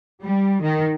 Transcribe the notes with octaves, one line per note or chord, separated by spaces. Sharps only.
G3
D#3